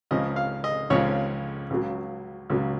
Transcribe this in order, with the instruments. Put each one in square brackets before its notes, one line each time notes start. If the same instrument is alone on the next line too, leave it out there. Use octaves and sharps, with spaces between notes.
[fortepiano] C#2 C#3 F3 D#5
F5
D#5
C#2 C#3 F3 C#5
C#2 C#3 F#3
C#2 C#3 F#3